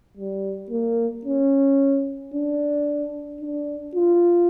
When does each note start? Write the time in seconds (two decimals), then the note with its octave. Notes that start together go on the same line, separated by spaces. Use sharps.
0.17 G3
0.71 A#3
1.25 C#4
2.34 D4
3.41 D4
3.95 F4